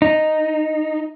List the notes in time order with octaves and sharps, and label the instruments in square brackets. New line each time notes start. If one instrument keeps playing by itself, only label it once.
[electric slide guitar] D#4